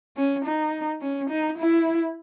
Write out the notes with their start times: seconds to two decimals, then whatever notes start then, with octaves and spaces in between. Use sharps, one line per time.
0.16 C#4
0.45 D#4
1.01 C#4
1.30 D#4
1.58 E4